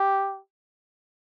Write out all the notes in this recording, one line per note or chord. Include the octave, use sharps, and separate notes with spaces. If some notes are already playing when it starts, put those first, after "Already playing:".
Already playing: G4